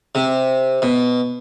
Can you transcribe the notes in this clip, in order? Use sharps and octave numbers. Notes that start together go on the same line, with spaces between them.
C3
B2